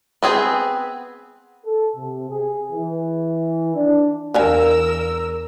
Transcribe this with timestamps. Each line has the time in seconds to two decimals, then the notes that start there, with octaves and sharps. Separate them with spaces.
0.23 B3 C4 G#4
1.66 A4
1.96 C3
2.30 G#4
2.72 E3
3.76 D4
4.34 E2 D4 A#4 F5 G#5 E6